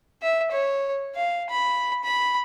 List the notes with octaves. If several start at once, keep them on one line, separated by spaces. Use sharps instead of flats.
E5
C#5
F5
B5
B5